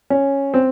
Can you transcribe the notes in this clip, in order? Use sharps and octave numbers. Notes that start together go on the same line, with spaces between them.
C#4
C4